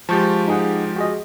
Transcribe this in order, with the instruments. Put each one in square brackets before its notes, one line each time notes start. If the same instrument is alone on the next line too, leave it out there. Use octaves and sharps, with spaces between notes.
[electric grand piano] F3 G#3 G4 [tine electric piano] A5 C#6 G6
[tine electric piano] D#4 G#4 F#5
F#4 G#4 D#5